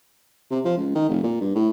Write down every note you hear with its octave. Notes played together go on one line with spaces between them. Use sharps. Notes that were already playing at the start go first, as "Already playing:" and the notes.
C3
F3
C#2
D#3
F1
A#2
G2
A2